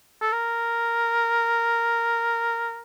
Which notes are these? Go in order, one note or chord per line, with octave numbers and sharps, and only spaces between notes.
A4
A#4